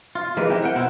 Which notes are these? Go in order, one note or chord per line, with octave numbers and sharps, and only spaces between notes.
F4
E3 G#3 A#3 G4 B4
C4 E4 G5 A#5
A#4 F#5 G5
B2 C4 E4